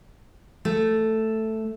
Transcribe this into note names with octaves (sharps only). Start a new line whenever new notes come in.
A3